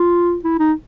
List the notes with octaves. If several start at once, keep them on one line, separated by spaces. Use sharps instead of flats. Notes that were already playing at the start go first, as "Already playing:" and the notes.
Already playing: F4
E4
D#4